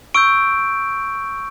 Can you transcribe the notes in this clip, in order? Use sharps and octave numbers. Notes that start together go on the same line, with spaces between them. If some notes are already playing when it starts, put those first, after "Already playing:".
C#6 E6 G6 D7